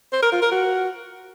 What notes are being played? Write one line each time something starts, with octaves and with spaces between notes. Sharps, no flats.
C5
A#4
F4
A#4
F#4